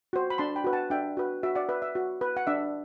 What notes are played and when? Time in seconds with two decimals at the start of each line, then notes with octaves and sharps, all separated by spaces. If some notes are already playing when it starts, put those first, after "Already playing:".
0.13 F#4 C5
0.30 B5
0.38 D4 A5 C6
0.56 G5 B5
0.64 F#4 B4
0.73 F#5 A5
0.90 D4 E5 G5
1.17 F#4 B4
1.43 F#4 E5
1.55 D5 F#5
1.69 B4 E5
1.82 E5
1.95 F#4
2.21 B4
2.37 F#5
2.47 D4 E5